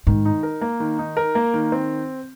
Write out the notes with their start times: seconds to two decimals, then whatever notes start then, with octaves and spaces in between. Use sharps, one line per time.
0.07 G#2 D#3
0.25 D#4
0.43 A#4
0.61 A#3
0.80 D#3
0.99 D#4
1.17 A#4
1.35 A#3
1.54 D#3
1.72 C4